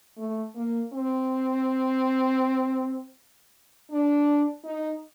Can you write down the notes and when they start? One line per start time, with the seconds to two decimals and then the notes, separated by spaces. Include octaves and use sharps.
0.18 A3
0.55 A#3
0.93 C4
3.91 D4
4.65 D#4